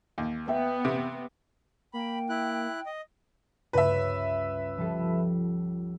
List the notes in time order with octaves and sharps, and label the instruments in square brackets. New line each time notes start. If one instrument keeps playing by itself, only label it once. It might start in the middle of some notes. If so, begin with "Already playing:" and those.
[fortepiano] D#2
[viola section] B3 [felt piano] E5 G5
[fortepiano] C3
[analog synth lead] A#3 [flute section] G5 [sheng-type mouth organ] B5
[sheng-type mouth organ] E4 F#6
D#5
[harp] C#2 G2 [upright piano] B4 E5
[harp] F3 G3 A4